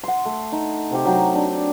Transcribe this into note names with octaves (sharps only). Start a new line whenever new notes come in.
F#5 C6
A3
D#4
C3 C4 G4
F#3 D#4 G4
D4